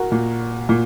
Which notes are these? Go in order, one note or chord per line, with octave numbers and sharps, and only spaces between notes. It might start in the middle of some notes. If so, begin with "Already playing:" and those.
Already playing: F#4 A#4
A#2
A#2